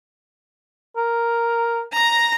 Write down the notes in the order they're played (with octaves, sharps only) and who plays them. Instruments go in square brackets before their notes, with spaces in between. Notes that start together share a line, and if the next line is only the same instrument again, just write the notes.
[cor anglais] A#4
[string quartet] A#5 A#6